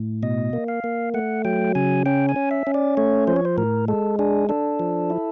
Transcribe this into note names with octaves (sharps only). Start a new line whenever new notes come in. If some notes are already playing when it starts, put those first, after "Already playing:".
Already playing: A2
B2 D#5
A#3
F5
A#3
A3 F#5
F#3 G5
C#3 G#5
C#4 G5
G#5
C#4
E5
C#4
D5
A3 C#5
F3 C5
C#5
C5
A2 A#4
G#3 A4
D4 G#4
D4 A4
F3
E4